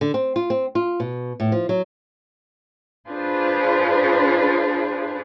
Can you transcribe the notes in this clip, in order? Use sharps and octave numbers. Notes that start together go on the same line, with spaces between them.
D3
C4
F4
C4
F4
B2
A2
F3
F#3
D4 F4 G#4 B4 C5